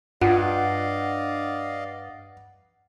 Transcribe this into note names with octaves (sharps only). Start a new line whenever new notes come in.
G2 F4 D5 D#5 F5 F#5